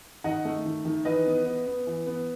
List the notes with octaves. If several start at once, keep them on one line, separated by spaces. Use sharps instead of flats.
D#3 D#5 F#5
A3
D#3
D#3
E3 B4 D#5
B3
B3
B3
E3
B3